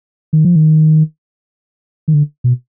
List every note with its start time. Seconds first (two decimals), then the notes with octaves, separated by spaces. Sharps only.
0.33 D#3
0.45 F3
0.56 D#3
2.08 D#3
2.14 D3
2.44 B2